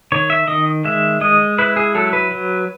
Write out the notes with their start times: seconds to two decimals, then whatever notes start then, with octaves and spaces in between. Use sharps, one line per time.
0.12 D#3 C#5
0.30 E5
0.48 D#3 D#5
0.85 G#3 E5
1.21 G#3 D#5
1.58 E4 B4
1.77 G#4
1.95 F#3 A4
2.13 B4
2.31 F#3